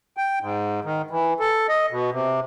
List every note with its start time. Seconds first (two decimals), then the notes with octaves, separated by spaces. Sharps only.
0.17 G5
0.42 G#2
0.84 D#3
1.11 E3
1.40 A4
1.69 D#5
1.91 B2
2.12 C3